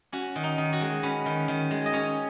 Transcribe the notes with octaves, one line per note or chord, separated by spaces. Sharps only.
C#4 F#4
D#3
D#4
D#3
F#4
G#3
C#4 B4
D#3
D#3
G#3
D#5
C#4 C#5